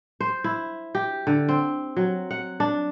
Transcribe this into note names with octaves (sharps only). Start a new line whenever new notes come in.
C5
E4
G4
D3
C4
F#3
F#5
D4